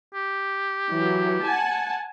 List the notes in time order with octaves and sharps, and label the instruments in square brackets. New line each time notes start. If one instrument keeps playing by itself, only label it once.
[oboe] G4
[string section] E3 F#3
F#5 G#5 A5